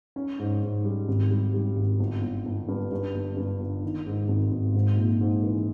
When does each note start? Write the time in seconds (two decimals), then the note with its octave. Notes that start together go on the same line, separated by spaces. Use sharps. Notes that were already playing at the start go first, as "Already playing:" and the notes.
0.16 C#4
0.39 G#2
0.62 G#2
0.84 G3
1.08 G#1
1.31 G3
1.54 G3
1.76 G#1
2.00 G1
2.22 G1
2.46 G1
2.68 G2
2.92 G2
3.14 G1
3.37 G2
3.60 G1
3.83 D#3
4.06 G#2
4.28 G#1
4.51 G#1
4.74 G#2
4.97 A#1
5.21 G#2
5.43 E3